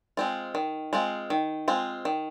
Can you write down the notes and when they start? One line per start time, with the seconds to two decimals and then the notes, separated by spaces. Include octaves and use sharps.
0.17 G#3 C4 F4
0.55 D#3
0.93 G#3 C4 F4
1.30 D#3
1.68 G#3 C4 F4
2.05 D#3